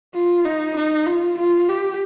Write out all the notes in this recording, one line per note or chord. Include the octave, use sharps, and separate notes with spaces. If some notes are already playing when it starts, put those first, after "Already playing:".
F4
D#4
D#4
F4
F4
G4